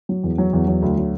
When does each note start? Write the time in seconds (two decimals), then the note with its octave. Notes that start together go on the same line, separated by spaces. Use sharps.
0.09 F#3
0.24 E2
0.38 F#3
0.53 E2
0.67 F#3
0.82 D2
0.97 F#3